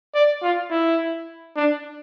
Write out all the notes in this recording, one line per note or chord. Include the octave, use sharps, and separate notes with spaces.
D5
F4
E4
D4